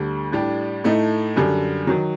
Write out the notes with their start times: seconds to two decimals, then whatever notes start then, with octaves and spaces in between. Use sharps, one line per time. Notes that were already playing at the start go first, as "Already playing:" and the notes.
Already playing: D2 D3 G3
0.32 A2 G3 D4 G4
0.84 A2 A3 D#4
1.36 F#2 D3 G3
1.87 D#3 F#3